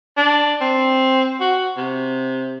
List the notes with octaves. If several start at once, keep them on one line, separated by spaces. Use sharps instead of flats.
D4
C4
F#4
C3